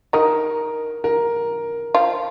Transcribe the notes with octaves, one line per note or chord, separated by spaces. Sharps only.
D#3 D#4 A#4
A#4
F3 F4